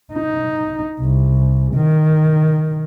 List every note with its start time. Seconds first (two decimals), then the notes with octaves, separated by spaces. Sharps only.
0.13 D#4
1.00 C2
1.75 D#3